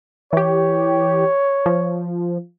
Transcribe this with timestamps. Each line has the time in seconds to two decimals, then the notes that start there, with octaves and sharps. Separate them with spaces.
0.33 E3 G4 C#5
1.66 F3